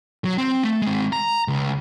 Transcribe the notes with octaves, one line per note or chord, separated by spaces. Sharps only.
F#3
C4
A3
G#3 C4
A#5
C#2